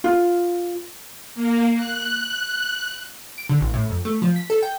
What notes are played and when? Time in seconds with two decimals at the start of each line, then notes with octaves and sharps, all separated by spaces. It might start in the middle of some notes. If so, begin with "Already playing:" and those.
0.04 F4
1.35 A#3
1.75 F#6
3.38 D7
3.49 D3
3.61 A1
3.74 A2
3.90 F2
4.05 A3
4.22 F3
4.36 B6
4.50 A4
4.63 G5